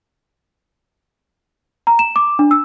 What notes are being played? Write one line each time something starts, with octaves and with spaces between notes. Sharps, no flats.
A#5
E7
D6
D4
E6